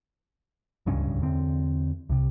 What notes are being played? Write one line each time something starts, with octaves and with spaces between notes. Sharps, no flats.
D1 C#2 G2 C#4
E2 D3 C4
C2 C3